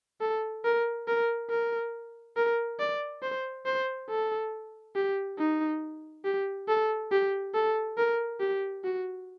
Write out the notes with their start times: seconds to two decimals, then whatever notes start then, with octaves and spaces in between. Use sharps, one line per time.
0.21 A4
0.64 A#4
1.08 A#4
1.50 A#4
2.37 A#4
2.80 D5
3.23 C5
3.66 C5
4.10 A4
4.96 G4
5.39 D#4
6.25 G4
6.68 A4
7.12 G4
7.55 A4
7.98 A#4
8.41 G4
8.84 F#4